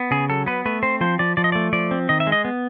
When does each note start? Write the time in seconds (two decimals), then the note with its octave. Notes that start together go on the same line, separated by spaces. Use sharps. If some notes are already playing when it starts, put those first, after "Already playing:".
Already playing: B3
0.11 C#3 G#4
0.29 F#3 A4
0.46 B3 B4
0.66 A3 B4
0.83 C4 C5
1.01 F3 C5
1.19 F3 D5
1.37 F3 D5
1.44 D#5
1.52 A3 D5
1.73 F3 D5
1.91 C4
2.09 D#3 D#5
2.20 E5
2.27 G#3
2.32 D#5
2.45 B3